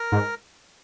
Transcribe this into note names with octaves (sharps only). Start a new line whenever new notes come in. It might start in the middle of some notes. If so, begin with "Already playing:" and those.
Already playing: A#4
G#2